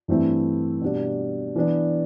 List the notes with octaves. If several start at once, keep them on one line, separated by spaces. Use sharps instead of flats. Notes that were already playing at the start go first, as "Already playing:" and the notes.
G2 E3 A3 C4 E4
B2 G3 D4
E3 B3 D4